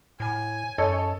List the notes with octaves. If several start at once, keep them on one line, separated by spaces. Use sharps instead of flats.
A2 G#5
F#2 A4 C#5 D#5